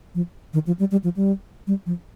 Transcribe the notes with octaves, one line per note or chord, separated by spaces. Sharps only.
F3
D#3
F3
G3
G3
F3
G3
G3
F3